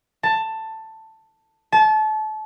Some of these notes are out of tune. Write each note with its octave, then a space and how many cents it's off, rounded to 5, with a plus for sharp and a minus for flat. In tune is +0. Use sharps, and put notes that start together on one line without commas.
A5 +10
A5 -30